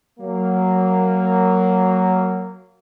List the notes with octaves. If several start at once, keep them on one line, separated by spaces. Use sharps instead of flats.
F#3 A#3